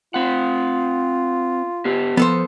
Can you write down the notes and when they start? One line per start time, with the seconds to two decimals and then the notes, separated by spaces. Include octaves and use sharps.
0.14 C4 F4 F#5
1.85 B3 G4
2.17 F3 B3 A4 C5